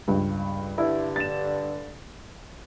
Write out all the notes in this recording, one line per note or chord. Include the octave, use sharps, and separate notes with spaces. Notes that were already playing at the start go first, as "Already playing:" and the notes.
C#2 G2
G2 D3 E4
A6 E7